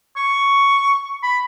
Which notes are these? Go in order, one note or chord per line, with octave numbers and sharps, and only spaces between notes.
C#6
B5